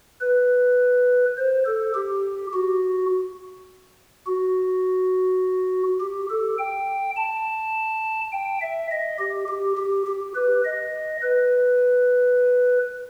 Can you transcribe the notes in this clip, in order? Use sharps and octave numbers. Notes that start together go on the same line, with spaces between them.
B4
C5
A4
G4
F#4
F#4
G4
A4
G5
A5
G5
E5
D#5
G4
G4
G4
G4
B4
D#5
B4